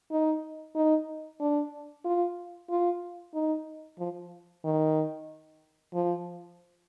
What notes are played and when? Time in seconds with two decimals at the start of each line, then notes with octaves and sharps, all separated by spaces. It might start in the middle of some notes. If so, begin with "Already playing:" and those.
0.12 D#4
0.75 D#4
1.41 D4
2.05 F4
2.70 F4
3.34 D#4
3.99 F3
4.65 D#3
5.94 F3